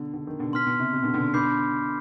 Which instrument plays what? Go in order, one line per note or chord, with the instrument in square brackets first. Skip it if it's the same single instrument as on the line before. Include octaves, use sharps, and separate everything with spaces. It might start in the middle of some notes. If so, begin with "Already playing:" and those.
Already playing: [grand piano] B2 D3
D3
D#3
B2 D3
[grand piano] B2 [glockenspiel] C6 F6 B6
[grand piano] B2
C3
C3
B2 D3
B2 D3
[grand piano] B2 D3 [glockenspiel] B5 D6 G6 C7